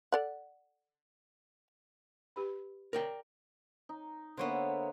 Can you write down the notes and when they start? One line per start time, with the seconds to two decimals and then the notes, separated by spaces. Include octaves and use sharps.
0.12 A4 D5 F#5
2.36 G4 B4 B5
2.93 A#4 D5 G5
3.89 D#4
4.37 D3 A#3 B3 C5 C#5 E5